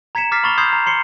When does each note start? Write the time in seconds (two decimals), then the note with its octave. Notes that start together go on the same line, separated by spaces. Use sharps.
0.15 A#5 G#6 B6 C#7 E7
0.32 D6 F6 A6 B6 C7
0.44 B5 C#6 F6 A6 F7 G7
0.58 C6 D#6 G6 G#6 C7
0.73 A#5
0.86 C6 C7 C#7 G7